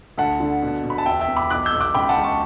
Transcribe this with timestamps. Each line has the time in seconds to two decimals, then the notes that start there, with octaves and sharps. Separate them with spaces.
0.17 D2 F#5 A5
0.40 D3
0.62 B2
0.84 B2
0.90 B5
0.98 A5
1.06 E2 E5 G5
1.21 E5 G5
1.28 E2
1.36 B5 D6
1.50 B1 D6 F#6
1.65 E6 G6
1.73 B1
1.80 D6 F#6
1.94 C#2 G5 B5
2.09 F#5 A5
2.17 C#2
2.24 A5 C#6